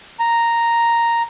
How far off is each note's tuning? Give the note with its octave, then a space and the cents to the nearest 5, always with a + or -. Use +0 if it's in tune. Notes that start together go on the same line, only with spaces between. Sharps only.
A#5 -5